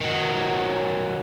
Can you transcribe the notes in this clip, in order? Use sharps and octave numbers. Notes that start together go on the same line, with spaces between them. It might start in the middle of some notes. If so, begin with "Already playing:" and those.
D#3 F#3